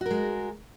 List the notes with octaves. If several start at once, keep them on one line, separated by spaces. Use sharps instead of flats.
G#3 F#4 A#4